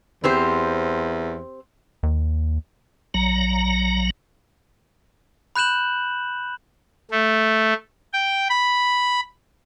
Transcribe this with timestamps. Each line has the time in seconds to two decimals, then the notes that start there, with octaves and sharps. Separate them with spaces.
0.24 E2 C4 G4 C5
2.03 D#2
3.14 A#1 F#3 A#5
5.56 B5 F#6 G6 E7 F#7
7.11 A3
8.13 G5
8.49 B5